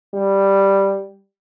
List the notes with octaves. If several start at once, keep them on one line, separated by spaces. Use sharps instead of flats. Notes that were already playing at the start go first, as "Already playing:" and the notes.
G3